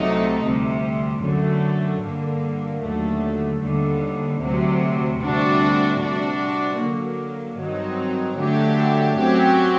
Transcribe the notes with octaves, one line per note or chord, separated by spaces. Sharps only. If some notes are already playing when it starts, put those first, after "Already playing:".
Already playing: C2 C3 F#3 A3 D#4
D2 C3 G3
F#2 D3 F#3 A3
G2 D3 G3 A#3
D#2 D3 F#3 A3
D#2 D3 G3
D2 C3 F#3
D2 C3 G3 D4 F#4
C3 G3 D4 F#4
D3 F#3 A#3
G2 D#3 F#3 C4 D#4
D3 F#3 A3 D4 G4
F#2 F#3 C4 G4